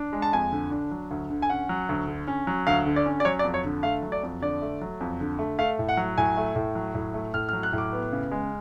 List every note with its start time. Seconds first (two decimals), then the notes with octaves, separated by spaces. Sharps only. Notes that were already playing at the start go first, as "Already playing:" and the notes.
Already playing: D4
0.13 G#3
0.22 A5
0.33 F2 G#5
0.52 D3
0.71 D4
0.91 F#3
1.11 D2
1.30 D3
1.42 G#5
1.49 C#4 F#5
1.69 F#3
1.89 D2
2.07 D3
2.27 C#4
2.47 F#3
2.67 D2 F5
2.86 D3
2.96 D5
3.06 C#4
3.20 D5
3.25 F#3 C#5
3.39 D5
3.44 F2
3.54 C#5
3.64 D3
3.83 A3 F5
4.02 F#3
4.12 D5
4.23 F2
4.42 D3 D5
4.62 A3
4.81 F#3
5.01 F2
5.20 D3
5.39 A3
5.59 A3 F5
5.79 A2
5.89 F#5
5.97 F#3
6.18 A2 G#5
6.37 A3
6.56 A2
6.75 F#3
6.95 A2
7.14 A3
7.34 A2 F6
7.49 F6
7.53 F#3
7.63 F#6
7.73 A2
7.78 D6
7.92 B3
8.12 C#3
8.31 G#3